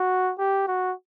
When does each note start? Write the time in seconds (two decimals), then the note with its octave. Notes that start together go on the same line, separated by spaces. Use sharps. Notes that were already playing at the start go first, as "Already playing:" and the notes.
Already playing: F#4
0.38 G4
0.67 F#4